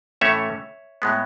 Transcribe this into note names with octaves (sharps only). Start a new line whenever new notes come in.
A2 E3 A3 C#4 C#5 E5
A2 G#3 B3